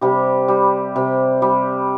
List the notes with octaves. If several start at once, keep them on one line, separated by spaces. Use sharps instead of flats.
C3 G3 G4
G3
C3
G3